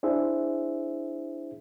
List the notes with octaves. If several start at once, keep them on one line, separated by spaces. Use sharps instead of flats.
D4 E4 G#4 C5 E5